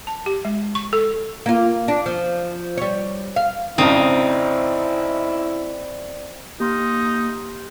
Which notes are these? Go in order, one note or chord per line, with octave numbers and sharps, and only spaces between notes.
A5
G4
G#3
C#6
A4
A#3 F4
D4
F3
G3 C#5
F5
G#1 F2 C#3 C4 D#4 E4 D5
A#3 D#4 G4 C6 F6